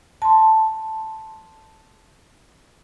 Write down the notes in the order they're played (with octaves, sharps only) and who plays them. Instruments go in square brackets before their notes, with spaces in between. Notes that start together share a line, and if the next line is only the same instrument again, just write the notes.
[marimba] A5 C6